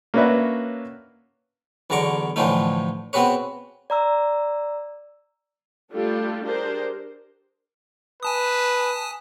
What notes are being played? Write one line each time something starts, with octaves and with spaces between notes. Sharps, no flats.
A#3 C#4 D4 F#4 B4 E5
B1 E2 D3 A#5 C#6 D6
A2 D3 E3 F3 A3 D#4
B3 C4 F#4 G#4 B4 C#5
D5 A#5 E6
G3 A3 D4 F4 G4 A4
D4 G4 G#4 A#4 C5
B4 G#5 A5 D#6